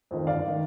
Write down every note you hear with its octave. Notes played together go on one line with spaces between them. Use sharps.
F2 D#3
G1 D5 F5
D#3